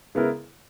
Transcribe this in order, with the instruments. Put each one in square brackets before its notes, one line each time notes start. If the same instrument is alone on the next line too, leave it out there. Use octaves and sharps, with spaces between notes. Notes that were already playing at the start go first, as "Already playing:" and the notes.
[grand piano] C#3 G#3 B3 E4 A#4